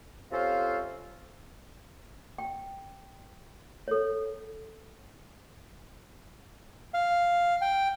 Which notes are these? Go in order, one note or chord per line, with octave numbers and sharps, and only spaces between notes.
C3 C#4 F4 A4 C5 F5
G5
A4 C#5
F5
G5